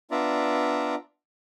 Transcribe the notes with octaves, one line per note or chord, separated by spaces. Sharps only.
B3 D4 F4 D5 E5 A#5